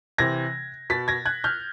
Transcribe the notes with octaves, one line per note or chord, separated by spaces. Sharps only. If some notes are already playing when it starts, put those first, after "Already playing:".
C3 E3 G#6 A#6
B2 A6 B6
G#6 A#6
F#6 G#6
F6 G6